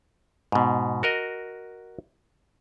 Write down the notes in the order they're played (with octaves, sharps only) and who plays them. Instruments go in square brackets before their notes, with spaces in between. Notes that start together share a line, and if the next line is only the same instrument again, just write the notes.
[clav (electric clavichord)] G#2 B2
F#4 A#4 D#5